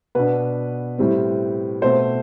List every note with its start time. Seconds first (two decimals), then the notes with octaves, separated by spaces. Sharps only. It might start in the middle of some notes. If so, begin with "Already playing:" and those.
0.15 B2 B3 D4 B4
0.98 A2 G3 C4
1.82 B2 A3 C4 C5